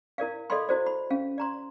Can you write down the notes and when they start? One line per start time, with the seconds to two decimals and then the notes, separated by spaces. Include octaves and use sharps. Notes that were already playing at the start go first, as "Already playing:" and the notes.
0.18 E4 A#4 D5 F5
0.50 A4 D5 D#5 F5 B5 C6
0.69 E4 F#4 C5 D5
0.86 B5
1.11 C#4 F5
1.38 D5 A#5 C6